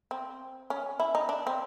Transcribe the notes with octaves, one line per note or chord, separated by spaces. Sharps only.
C4
C#4
E4
D#4
D4
C4